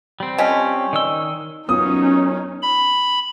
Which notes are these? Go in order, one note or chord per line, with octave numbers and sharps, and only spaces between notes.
G3 C4
F3 C#4 D#5 B6
D#3 D5 D#5 E6 G7
F#2 B3 C#4 D#4 F4 D#6
B5